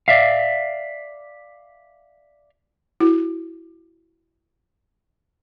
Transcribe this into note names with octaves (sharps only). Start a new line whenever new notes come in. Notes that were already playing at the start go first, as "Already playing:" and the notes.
D5 E5 F5
E4 F#4